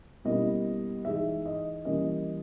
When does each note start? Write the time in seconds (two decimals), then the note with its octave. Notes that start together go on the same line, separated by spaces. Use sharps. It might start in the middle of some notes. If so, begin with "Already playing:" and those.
0.25 B2 G3 A#3 C#4 E4 D#5
1.05 E3 G#3 D#4 E5
1.46 D#5
1.85 E3 G3 A#3 C#4 D#5